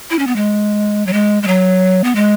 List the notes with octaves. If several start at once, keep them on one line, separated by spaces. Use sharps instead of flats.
E4
C#4
B3
G#3
F#3
G#3
G#3
F#3
B3
G#3